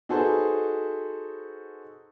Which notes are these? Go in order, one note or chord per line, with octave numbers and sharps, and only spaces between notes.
D#4 F#4 G#4 A4 B4 C5